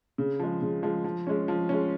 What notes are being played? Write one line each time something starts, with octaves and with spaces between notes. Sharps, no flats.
C#3
F3 G#3
C#3
F3 G#3
F3
G#3 C#4
F3
G#3 C#4